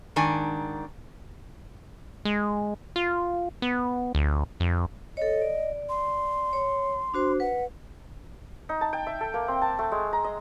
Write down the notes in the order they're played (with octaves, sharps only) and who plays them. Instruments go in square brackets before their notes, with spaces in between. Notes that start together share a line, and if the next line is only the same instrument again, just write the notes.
[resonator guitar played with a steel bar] G#2 D#3 D4 G#5
[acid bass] G#3
F4
B3
D2
F2
[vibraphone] A4 C#5 [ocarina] D#5
[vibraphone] D5
[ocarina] C6
[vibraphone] C#5
D4 F#4 C5
[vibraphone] B4 [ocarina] F#5
[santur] D#4
A5
G5
E5
A4
A#3
C4
A5
A3
G#3
A#5
D#5